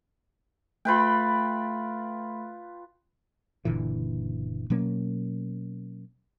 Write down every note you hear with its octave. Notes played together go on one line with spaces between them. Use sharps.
A3 F4 B4 G5 B5
F#1 A#2 D3 E3
B2 F#3 A#3 C#4